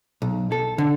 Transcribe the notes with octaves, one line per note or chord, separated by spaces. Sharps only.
B1
A4
D3